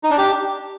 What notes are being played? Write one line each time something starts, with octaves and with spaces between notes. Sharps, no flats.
D#4
D4
G4